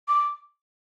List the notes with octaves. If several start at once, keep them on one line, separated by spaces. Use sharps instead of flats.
D6